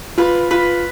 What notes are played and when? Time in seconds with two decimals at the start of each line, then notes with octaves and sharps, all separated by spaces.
0.18 F4 B4
0.51 F4 B4